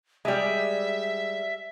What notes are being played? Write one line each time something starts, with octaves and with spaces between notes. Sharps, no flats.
G3 G#3 E5